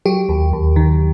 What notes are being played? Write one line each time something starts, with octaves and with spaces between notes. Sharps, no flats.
F#3 G4
D#2
D#2
D#3